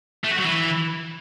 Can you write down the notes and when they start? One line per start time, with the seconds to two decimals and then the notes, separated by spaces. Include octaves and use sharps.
0.24 A3
0.31 F#4
0.38 F#3
0.45 E3